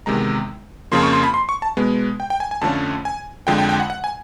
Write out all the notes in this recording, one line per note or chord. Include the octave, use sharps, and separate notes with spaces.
E2 C3 D#3 G#3 A#5
F2 C#3 F3 A#3 C6
C#6
C6
B5
C6
C#6
A5
B2 G#3 B3
G5
G5
G#5
G#5
F2 D3 F3 A3 C#4 A5
G#5
F2 D3 F3 G#3 G5
G5
G5
F#5
F#5
G#5